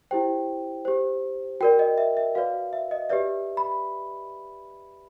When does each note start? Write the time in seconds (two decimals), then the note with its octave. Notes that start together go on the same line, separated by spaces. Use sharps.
0.11 E4 G4 C5 G5
0.85 G4 C5
1.61 F#4 A#4 D5 G5
1.79 D#5
1.98 E5
2.17 E5
2.35 F#4 B4 D5 F5
2.73 E5
2.91 D#5
3.10 G4 B4 D5 E5
3.57 B5